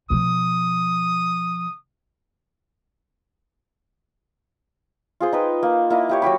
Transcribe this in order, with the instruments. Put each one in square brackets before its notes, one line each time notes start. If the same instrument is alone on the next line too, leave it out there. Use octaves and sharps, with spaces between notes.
[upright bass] B2 F3 [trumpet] D#6
[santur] F4 G#4 C5
D#4 B4 G5
A#3
A#3 E4 D#5
E4 G4 C#5
F#3 F#4 G4 B5